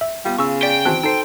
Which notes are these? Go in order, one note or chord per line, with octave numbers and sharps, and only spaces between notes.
E5
G3 B3 F4
C#3 C#6 E6
D5 G5 B6
E3 C4 F#4 A5 F#6
D#4 A4 C5 C7